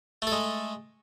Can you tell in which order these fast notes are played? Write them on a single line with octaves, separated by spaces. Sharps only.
A3 A4 G#3